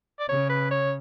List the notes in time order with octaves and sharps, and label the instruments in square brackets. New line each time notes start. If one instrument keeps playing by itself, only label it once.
[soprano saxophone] D5
[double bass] C#3 [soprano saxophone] C#5
[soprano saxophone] B4
C#5